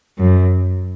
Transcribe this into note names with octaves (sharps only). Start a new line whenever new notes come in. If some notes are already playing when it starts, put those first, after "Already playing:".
F#2